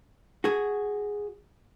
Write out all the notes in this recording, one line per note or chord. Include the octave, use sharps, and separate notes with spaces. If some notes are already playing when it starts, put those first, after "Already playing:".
F#4 G#4